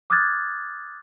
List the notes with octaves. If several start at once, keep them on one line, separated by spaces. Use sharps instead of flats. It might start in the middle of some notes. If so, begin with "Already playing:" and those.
D6 D#6 F6 F#6 G#6 A6